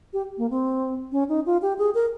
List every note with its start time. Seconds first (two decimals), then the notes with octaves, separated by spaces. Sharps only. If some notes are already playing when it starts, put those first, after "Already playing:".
0.13 G4
0.38 A#3
0.50 C4
1.12 C#4
1.29 D#4
1.46 F4
1.62 G4
1.78 G#4
1.94 A#4